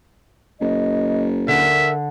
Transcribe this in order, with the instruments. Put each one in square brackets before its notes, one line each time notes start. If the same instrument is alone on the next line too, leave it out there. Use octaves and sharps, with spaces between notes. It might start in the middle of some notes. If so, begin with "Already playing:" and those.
[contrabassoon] F#1 [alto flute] D#5
[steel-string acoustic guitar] D3 [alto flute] A#4 [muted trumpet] E5